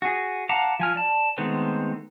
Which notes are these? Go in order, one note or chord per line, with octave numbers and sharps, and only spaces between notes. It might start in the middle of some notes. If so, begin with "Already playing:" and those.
F#4 G#4
F5 F#5 A5 A#5 D6
F3 G#5 F6
D5 A5
D#3 G#3 A3 B3 C4